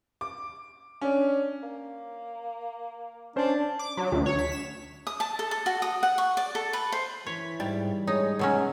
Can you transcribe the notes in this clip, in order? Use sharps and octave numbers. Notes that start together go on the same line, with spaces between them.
D6
C#4 D4
A#3
C#4 D4 C5
D6
F#3
D2
C#5
B6
E7
D#6
A5
A4
A4
F#4
D#6
F#5
C#6
D5
A4
B4
C5
E3 C#5 B6
G#2 G3
G#3 D#4 C#5
B2 F#3 G#3 C#4